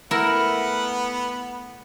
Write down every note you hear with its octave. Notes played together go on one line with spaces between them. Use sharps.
A3 B3 E4 A#4 F#5